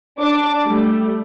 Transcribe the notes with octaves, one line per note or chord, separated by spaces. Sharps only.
D4 D6
G3 A3